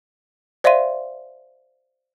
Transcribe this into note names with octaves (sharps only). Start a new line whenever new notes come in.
C5 D5 E5 F5 C6 D#7